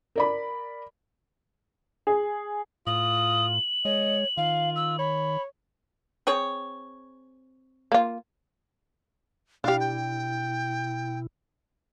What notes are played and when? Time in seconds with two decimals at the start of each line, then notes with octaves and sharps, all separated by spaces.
0.16 A#4 D5 B5
2.07 G#4
2.87 A2 F4 D#6 F#7
3.85 G#3 C#5 D#5
4.37 D#3 F4 F5
4.76 E6
4.99 C#5 B5
6.27 C4 G#4 C#5
7.92 A#3 F4
9.64 B2 D4 E4 G4 F5
9.80 G5